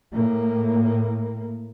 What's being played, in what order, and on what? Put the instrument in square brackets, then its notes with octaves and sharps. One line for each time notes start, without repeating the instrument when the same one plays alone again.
[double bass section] A2 A#3